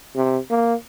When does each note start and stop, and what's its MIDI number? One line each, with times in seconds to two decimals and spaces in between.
0.16 0.38 48
0.51 0.74 58